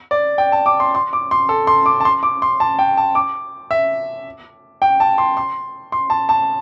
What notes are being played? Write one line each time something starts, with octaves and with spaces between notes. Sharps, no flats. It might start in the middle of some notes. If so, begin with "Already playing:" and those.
D5
G5
A5
D6
C6
C6
D6
C6
A4
C6
D6
A5
C6
D6
C6
A5
G5
A5
D6
E5
G5
A5
C6
C6
C6
A5
A5